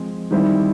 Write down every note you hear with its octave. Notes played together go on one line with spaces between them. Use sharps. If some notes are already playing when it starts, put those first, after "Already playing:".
Already playing: F3 G#3 C4
D#3 G3 C4 E4